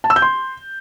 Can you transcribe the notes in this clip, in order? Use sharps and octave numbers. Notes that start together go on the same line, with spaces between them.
A5
E6
G6
C6